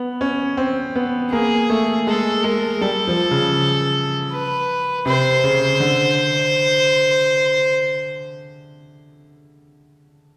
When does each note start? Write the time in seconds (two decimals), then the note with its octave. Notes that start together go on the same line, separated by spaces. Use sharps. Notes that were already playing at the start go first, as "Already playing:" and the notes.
Already playing: B3
0.21 C#4
0.57 C4
0.96 B3
1.32 A#3 G#4
1.70 A3
2.07 G#3 A4
2.44 G#3 A#4
2.81 G3 A4
3.07 F3
3.31 C#3
4.31 B4
5.06 C3 C5
5.44 C#3
5.80 D3